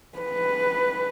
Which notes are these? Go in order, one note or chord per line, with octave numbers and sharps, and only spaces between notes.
B4